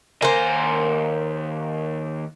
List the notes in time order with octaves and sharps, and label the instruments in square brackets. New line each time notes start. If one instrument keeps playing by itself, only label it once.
[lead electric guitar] D#2 G#5 [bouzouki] A#3 C5